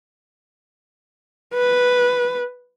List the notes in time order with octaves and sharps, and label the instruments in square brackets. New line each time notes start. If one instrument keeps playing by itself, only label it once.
[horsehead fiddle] B4